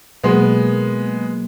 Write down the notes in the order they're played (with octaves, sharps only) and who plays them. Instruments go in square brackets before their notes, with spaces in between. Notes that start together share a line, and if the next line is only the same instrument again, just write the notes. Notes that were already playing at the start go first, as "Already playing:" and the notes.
[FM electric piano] B2 F#3 A#3 [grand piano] G#3 B3